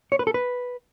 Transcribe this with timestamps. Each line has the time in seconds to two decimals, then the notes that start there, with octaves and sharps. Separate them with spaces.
0.12 C#5
0.19 B4
0.27 A4
0.34 B4